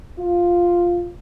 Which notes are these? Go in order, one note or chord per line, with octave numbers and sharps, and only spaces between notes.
F4